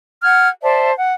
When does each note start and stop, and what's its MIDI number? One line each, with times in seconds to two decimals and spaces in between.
0.23 0.49 78
0.23 0.49 79
0.23 0.49 89
0.23 0.49 92
0.63 0.92 72
0.63 0.92 74
0.63 0.92 76
0.63 0.92 81
0.97 1.13 78